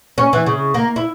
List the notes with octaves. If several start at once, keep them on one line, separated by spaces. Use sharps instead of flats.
C#4
E3
C#3
A#3
E4